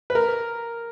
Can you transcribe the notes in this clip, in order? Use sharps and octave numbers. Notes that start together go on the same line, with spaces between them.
B4
A#4